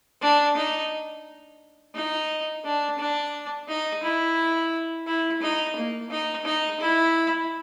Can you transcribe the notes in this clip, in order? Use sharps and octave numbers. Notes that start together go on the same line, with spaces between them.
D4
D#4
D#4
D4
D4
D#4
E4
E4
D#4
A#3
D#4
D#4
E4